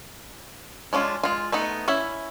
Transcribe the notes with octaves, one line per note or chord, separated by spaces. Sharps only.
G#3 C#4 D4 F4
G#3 F4
A3 B3 D#4
C#4 E4 E5 B5